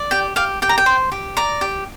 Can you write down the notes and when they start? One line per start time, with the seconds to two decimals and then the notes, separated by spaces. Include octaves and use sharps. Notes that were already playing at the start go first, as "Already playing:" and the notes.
Already playing: D5
0.11 G4 G5
0.36 G4 F5
0.62 G4 G5
0.69 A#5
0.78 G5
0.86 C5
1.12 G4
1.37 D5 A#5
1.61 G4